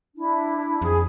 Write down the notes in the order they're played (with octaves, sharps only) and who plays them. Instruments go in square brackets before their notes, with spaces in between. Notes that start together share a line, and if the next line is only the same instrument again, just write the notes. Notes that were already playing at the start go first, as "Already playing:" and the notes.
[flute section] D4 E4
[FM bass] F2 [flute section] G#4